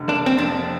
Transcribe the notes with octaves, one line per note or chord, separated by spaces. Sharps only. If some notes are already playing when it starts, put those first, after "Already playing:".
Already playing: F1 D3
A#3 D4
C4
F2 D4